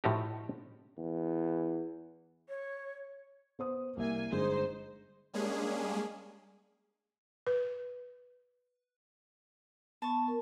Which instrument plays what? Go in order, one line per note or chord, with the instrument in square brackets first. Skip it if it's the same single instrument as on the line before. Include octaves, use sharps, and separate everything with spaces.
[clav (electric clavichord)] A2 F3 A3 D#4 F#4 G4
[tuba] E2
[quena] C#5
[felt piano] B3 C5 D#6
[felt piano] C2 E5 [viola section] A#3 G#5
[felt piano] G1 G#3 [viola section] D#4 C5
[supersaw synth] G3 G#3 A#3 C#4 D4 G#4
[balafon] B4
[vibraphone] B3 [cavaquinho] A5 C#6
[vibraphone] A#4